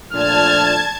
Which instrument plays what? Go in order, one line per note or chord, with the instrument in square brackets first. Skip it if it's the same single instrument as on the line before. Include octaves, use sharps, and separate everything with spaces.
[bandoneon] A#2 [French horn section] F3 A3 D4 [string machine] A5 G#6 [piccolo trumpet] F6